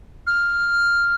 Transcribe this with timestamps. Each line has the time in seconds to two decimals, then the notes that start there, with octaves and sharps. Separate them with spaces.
0.27 F6